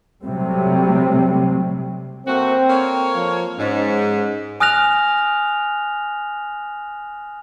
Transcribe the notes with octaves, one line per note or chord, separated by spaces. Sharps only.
C3 F#3 G3 A3 C4
A3 A#3 C4 F#4
A#3 A4 C#5
F3
G#2 C#4
G#5 D#6 F6 F#6 A#6 F7